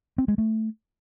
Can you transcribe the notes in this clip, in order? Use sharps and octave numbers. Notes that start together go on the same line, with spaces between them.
C4
G#3
A3